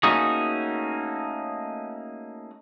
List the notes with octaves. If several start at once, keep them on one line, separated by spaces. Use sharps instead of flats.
A3 A#3 C#4 D#4 F#4 G#4